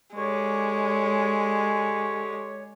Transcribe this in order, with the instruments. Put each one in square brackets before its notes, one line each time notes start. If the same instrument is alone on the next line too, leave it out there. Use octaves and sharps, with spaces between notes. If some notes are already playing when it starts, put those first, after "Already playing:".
[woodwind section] D3 G4 C#5 [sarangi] G#3